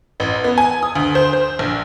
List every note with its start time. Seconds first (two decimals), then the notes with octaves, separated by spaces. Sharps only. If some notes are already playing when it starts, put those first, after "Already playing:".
0.20 A1
0.44 B3
0.58 G#5
0.83 D#6
0.96 D2
1.15 C5
1.33 C5
1.59 A#1